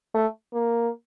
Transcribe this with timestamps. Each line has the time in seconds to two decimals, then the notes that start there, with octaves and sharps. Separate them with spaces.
0.14 A3
0.54 A#3